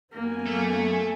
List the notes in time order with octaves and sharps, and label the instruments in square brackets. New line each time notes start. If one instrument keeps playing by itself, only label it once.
[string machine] F#2 G#5 [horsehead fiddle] A#3 [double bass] B3
[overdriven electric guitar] A3